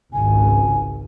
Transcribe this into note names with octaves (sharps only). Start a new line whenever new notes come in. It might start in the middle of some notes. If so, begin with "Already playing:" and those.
G#1 C#2 G#5